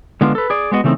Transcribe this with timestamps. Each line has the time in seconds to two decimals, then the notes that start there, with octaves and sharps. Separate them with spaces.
0.21 D3 G#3 B3 D4 F4
0.35 A4 B4
0.50 G#4 D5
0.72 G#3 B3 F#4 D#5
0.84 C#3 E3 A3 B3 C4 D#4